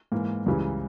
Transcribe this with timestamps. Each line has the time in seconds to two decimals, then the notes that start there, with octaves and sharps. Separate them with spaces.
0.12 G#2 E3 A#3
0.46 C#2 C#3 E3 G3